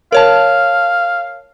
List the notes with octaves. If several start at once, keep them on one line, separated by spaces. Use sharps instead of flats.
A#4 C#5 F5 A5